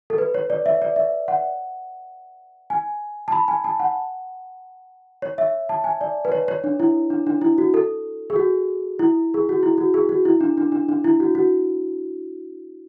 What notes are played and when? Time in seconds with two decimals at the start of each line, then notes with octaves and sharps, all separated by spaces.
0.10 A4
0.18 B4
0.34 C#5
0.50 D5
0.66 E5
0.82 D5
0.96 E5
1.28 F#5
2.70 G#5
3.28 A5
3.32 B5
3.48 G#5
3.64 A5
3.79 F#5
5.22 C#5
5.38 E5
5.69 A5
5.84 G#5
6.01 D5
6.25 B4
6.32 C#5
6.48 C#5
6.64 D4
6.80 E4
7.10 D4
7.27 D4
7.41 E4
7.58 F#4
7.74 A4
8.30 G#4
8.36 F#4
8.99 E4
9.34 G#4
9.49 F#4
9.63 E4
9.78 F#4
9.94 G#4
10.09 F#4
10.25 E4
10.41 D4
10.57 D4
10.72 D4
10.89 D4
11.04 E4
11.20 F#4
11.35 F#4